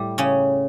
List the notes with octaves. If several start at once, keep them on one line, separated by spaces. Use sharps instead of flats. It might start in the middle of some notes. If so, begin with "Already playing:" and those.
Already playing: A2 G3
C#3 C#4